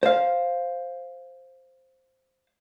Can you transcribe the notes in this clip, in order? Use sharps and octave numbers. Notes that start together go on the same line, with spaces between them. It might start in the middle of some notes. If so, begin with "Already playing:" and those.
C5 F5